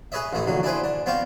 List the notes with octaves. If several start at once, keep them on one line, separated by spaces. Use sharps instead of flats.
G#4 B4 C#5 D#5 E5
A1 E3 A3 E4
A#1 D3 F#3
D4 E4 G#4 B4 C5
D4
B3 C4 C5 F5 C#6